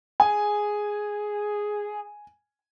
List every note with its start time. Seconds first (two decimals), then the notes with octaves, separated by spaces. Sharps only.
0.20 G#4 G#5